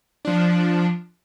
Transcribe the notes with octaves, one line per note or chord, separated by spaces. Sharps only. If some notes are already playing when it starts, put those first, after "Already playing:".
F3 D4